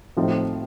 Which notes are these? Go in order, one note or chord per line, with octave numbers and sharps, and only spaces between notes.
A2 F3 A3 C4 D#4